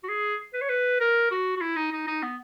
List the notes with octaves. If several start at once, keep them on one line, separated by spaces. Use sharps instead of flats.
F#4
G#4
B4
C#5
B4
A#4
F#4
F#4
E4
D#4
D#4
D#4
B3